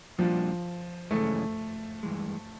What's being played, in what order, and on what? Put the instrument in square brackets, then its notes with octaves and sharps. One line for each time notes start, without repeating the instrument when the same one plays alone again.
[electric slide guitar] A#2 G3 A#3 D4 F#4 [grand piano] F3
[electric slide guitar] F#2 C#3 E3 G#3 C#4 [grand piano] A3
[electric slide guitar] G2 E3 G#3